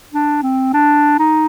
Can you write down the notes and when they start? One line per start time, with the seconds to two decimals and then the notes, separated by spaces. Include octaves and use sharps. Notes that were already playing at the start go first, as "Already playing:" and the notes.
0.13 D4
0.43 C4
0.74 D4
1.19 D#4